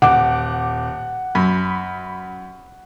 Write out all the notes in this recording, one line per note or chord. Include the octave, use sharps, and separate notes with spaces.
D#1 F#5 D6
F#2 B5